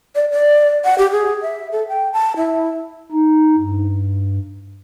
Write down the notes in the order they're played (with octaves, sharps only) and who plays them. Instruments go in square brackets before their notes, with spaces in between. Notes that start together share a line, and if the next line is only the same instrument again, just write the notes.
[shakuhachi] D5
D5
F#5
G4
G#4
E5
A4
G5
A5
E4
[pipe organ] D#4
G2